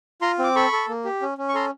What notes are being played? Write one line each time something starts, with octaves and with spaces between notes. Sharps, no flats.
F4 A#5 C6
C4 D6
A4 B5 C#6
A4
A#3
G4
C#4
C#4
C#6
A4 A#5 C6